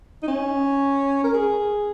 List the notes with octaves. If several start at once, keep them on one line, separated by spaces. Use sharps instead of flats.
D#4
C#4
A#4
G#4